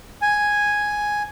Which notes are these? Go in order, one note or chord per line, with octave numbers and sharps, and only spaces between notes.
G#5